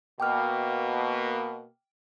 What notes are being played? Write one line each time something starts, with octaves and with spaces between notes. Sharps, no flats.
B2 A#3 G5 D6 F6